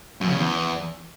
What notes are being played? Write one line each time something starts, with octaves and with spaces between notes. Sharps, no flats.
F#2
C#3
E2